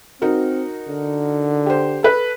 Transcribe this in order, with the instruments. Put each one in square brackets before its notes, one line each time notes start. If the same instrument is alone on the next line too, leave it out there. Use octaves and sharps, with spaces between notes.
[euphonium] C4 [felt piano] D#4 F#4 A#4
[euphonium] D3
[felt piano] G4 C5
A4 B4